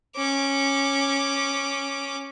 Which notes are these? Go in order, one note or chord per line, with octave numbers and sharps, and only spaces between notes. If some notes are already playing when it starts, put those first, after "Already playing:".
C#4 D6